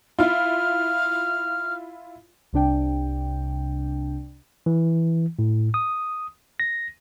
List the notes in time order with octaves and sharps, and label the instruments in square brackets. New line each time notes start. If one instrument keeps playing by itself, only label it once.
[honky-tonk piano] E4 F4 [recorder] F6
[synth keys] C2 C3 D4 G5
[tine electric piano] E3
A2
D#6
A#6